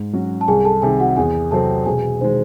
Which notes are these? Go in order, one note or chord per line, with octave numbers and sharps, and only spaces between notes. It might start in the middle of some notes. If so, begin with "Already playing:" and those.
Already playing: G#2
F#3 C#4 F#4
A5
C2 G#4 G#5
A4 A5
C3 D#3 G#4 G#5
F#4 F#5
E2 G#4 G#5
C3 F#3 C4 A4 A5
E1 G#4 G#5
D#3 G#3 C5